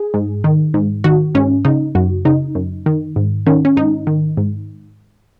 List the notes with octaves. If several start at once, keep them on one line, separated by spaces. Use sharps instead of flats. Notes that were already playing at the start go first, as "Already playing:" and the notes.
Already playing: G#4
G#2
D#3
G#2
D#3 F#4
G#2 C#4
C#3 D#4
F#2 F#4
C#3 D#4
F#2
D#3
G#2
D#3 C#4
C#4
G#2 D#4
D#3
G#2